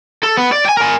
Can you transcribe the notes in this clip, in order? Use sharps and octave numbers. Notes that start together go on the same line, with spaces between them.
A4
B3
D5
G5 G#5
A#4 G#5